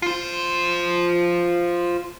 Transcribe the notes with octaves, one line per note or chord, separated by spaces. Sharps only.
F4 C5